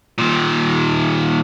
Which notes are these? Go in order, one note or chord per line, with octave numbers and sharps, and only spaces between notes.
A#2 D#3